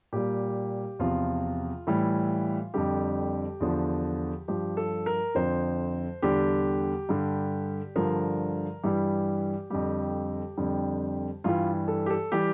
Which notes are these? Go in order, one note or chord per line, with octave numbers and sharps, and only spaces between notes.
A#2 G3 G4
E2 C3 F3 F4
A2 E3 G3
F2 D3 G3 G4
E2 D3 F3
G2 F3 G4
A4
A#4
F2 D3 F3 C5
E2 D3 G3 G4
G2 D3 G3
G2 D3 F3 A#4
G2 E3 G3 G4
F2 D3 G3 G4
F2 D3 G3
G2 E3 G3 F4
A4
G4
A4
E3 G3 G4